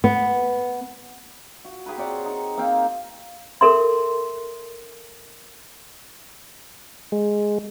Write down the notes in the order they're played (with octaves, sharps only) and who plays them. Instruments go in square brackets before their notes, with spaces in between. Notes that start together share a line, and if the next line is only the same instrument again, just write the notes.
[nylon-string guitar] B3
[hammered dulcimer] F#4
G4 G#4 A#4 B4
C4 C#5 D5 F#5
D#4
A#3 C4 F5 G5
[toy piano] A4 A#4 E5 C6
[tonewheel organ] G#3